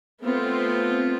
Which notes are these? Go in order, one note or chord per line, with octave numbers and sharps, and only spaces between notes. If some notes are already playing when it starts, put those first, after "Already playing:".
A3 B3 C4 F4